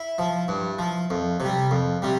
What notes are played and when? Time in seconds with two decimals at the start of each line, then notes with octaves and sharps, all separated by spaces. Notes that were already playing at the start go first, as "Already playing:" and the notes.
Already playing: E4
0.18 F3
0.48 G2
0.79 F3
1.10 F2
1.40 C3
1.45 G3
1.71 F2
2.02 C3 G3